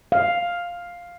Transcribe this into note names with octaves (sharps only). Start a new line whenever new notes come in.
F5